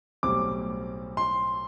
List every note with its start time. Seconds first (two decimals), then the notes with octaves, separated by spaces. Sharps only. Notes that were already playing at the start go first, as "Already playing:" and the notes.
0.23 B1 A2 G3 C4 D6
1.17 C6